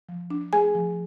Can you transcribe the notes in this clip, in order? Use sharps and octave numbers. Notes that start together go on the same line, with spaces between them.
F3
D4
A3 G#4 G#5
F3